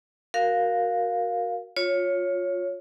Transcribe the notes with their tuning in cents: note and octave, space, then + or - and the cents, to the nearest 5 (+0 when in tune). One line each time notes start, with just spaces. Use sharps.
F#4 +0 A#4 +0 F5 +5
F4 +20 C#5 +0